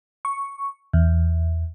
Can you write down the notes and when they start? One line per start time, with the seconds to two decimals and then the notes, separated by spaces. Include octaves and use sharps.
0.25 C#6
0.93 E2